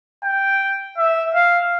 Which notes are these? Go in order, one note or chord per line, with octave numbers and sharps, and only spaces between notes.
G5
E5
F5